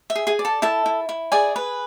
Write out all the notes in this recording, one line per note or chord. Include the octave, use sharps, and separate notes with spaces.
E5
G#4
G#4 G#5
D5
A4 A5
E4 A4 A5
E4
E4
G#4 D5 G#5
B4